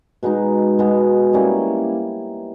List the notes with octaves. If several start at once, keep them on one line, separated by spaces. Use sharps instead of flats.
B2 G#3 B3 D#4
B2 G#3 B3 D#4
G3 A#3 C#4 E4